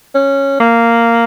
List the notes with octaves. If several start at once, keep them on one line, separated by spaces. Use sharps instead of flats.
C#4
A#3